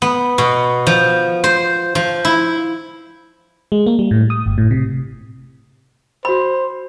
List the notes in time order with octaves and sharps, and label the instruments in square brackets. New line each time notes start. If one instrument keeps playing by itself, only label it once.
[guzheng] B3
B2
F3
C5
F3
E4
[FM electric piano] G#3
A#3
G3
A2
D#6
G1
A2
C3
[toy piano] F#4 B5 [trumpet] C5